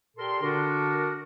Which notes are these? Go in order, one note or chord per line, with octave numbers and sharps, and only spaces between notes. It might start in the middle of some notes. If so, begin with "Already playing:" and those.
A#2 G4 A4 A#4 C6
D3 D4 F#4 A#4